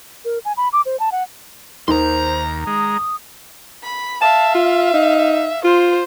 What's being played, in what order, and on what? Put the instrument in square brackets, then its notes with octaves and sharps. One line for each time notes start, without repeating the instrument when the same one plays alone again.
[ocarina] A#4
G#5
B5
D6
C5
A5
F#5
[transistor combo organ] D#2 [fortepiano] D#3 [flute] C5 [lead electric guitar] A#5 C6
[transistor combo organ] G#3 [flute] D#6
[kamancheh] B5
[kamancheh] E5 F5 [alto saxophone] A5
[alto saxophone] F4
D#4
[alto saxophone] F4 [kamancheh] C5